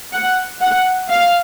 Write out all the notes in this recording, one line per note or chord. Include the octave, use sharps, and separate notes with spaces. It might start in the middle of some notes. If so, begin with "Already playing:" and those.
F#5
F#5
F5